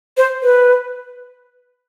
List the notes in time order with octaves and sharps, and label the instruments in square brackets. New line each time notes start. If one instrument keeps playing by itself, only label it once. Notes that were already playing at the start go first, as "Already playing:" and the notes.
[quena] C5
B4